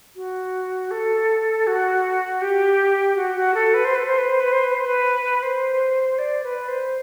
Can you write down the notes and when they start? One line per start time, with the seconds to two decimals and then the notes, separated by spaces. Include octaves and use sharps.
0.16 F#4
0.91 A4
1.67 F#4
2.41 G4
3.16 F#4
3.36 F#4
3.54 A4
3.74 B4
3.85 C5
3.95 B4
4.07 C5
4.18 B4
4.29 C5
4.40 B4
4.52 C5
4.64 B4
4.74 C5
4.85 B4
5.43 C5
6.19 D5
6.43 B4
6.68 C5